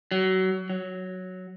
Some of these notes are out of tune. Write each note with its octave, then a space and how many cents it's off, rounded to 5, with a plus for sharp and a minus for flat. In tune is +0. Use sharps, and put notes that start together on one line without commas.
F#3 +25
F#3 +0